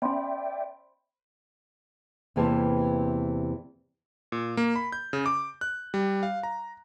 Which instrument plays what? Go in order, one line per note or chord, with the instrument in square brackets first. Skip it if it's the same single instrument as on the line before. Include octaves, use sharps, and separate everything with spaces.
[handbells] B3 C#4 [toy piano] C5 B5 C6 [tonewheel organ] D5 E5 G5
[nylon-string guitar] E2 C3 E3 A#3 G4 A5
[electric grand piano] A#2
A#3
B5
G6
C#3
D6
F#6
G3
F5
A#5